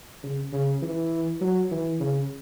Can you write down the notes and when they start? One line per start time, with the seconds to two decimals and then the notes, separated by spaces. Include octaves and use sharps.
0.23 C#3
0.52 C#3
0.82 E3
1.41 F#3
1.71 E3
2.00 C#3